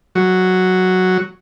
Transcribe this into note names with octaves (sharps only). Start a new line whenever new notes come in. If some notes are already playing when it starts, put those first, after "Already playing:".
F#3